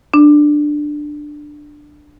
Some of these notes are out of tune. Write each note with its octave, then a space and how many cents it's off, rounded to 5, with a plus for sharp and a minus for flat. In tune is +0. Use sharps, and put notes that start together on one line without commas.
D4 +10